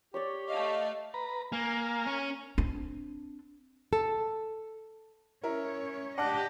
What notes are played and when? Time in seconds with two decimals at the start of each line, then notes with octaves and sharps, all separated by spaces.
0.14 G4 C#5 D5
0.47 A3 D#5 F5
1.14 B4 A#5
1.52 A#3 A#4 G#5 F6
2.06 C#4
2.58 C4 D4
3.93 A4
5.44 C#4 E4 A#4 C#5
6.18 D4 G4 D#5 F#5 F#6